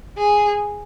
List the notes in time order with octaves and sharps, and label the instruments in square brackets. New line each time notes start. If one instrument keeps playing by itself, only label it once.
[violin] G#4